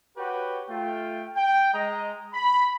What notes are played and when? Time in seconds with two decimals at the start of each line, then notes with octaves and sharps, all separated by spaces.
0.17 F#4 G4 B4 C#5 F#5 G5
0.69 A3 F4 G5
1.36 G5
1.73 G#3 D#5 A#5
2.34 B5